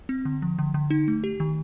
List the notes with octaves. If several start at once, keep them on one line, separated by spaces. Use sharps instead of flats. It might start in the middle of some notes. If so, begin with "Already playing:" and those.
C4
D3
F3
D3
D3
D#4
A3
G4
D#3